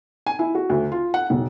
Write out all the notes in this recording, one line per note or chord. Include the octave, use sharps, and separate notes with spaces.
G#5
E4
F#4
D2
F4
F#5
E1